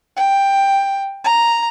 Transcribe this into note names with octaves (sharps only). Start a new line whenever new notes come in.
G5
A#5